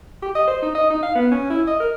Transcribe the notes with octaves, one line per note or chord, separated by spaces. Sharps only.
G4
D#5
C5
D#4
D#5
D#4
F5
B3
C#4
E4
D#5
A#4